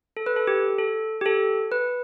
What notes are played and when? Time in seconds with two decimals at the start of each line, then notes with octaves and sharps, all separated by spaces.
0.17 A4
0.26 B4
0.36 A4
0.47 G4
0.78 A4
1.21 G4
1.26 A4
1.72 B4